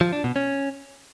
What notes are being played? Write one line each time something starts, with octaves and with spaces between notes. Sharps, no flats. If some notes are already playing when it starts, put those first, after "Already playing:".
F3
D4
B2
C#4